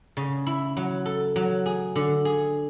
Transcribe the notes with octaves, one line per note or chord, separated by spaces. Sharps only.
C#3
E4
F#3
A4
F#3
G#4
D3
G#4